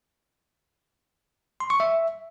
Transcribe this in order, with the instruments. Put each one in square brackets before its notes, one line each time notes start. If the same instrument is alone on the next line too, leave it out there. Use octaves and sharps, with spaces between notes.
[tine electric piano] C6
C#6
E5